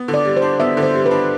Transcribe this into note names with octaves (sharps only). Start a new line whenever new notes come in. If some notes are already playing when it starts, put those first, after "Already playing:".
Already playing: B3
D3
D5
G3
C5
D4
B3 E5
D3
C5
G3
B4
D4